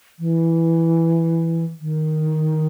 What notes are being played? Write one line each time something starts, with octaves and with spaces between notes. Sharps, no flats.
E3
D#3